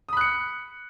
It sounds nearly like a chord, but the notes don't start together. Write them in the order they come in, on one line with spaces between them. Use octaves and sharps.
D#6 B5 F#6 C#7